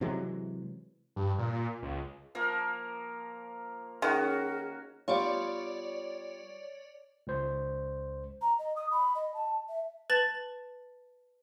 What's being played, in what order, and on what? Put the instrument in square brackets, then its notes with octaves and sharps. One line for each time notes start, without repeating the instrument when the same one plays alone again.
[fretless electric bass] C3 E3 F#3 G#3
[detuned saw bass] G2
A#2
C#2
[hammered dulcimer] F3 A#3 A#4
[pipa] D#3 [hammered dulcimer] C#4 F#4 [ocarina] G#4
[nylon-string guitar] G3 B3 F4 [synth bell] C#5 D5
[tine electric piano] C#2 C5
[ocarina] A#5
D#5
D#6
B5
D#5
A5
E5
[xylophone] B4 A5 A6 F#7